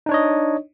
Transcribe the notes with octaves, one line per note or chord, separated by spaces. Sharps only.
D4 D#4 C#5 D#5